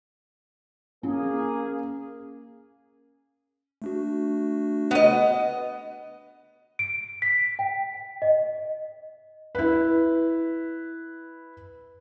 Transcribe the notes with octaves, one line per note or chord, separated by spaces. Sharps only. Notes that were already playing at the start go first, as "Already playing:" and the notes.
A#3 C#4 G#4
A3 D4 F#4
B3 D#5
D7
B6
G5
D#5
E4 B4